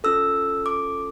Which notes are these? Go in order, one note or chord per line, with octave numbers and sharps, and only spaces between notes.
C#4 F4 A4 E6
D6